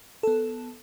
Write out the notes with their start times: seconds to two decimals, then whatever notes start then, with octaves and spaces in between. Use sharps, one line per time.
0.23 B3 A4